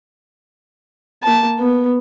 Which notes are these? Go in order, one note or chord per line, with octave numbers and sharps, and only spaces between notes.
A#3 A5
B3